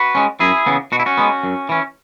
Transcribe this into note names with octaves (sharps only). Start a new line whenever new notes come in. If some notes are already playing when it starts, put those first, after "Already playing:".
Already playing: F#4 B4
G#3 C#4
F#2 E4 G#4
C#3 E3 B3
B2 F#4
E4
C#4 F#4
G#3 B3
F#2
E3 C#4